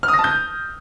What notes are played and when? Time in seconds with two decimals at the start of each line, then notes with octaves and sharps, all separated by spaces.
0.03 F6
0.08 D#6
0.14 A#6
0.19 A5
0.24 G6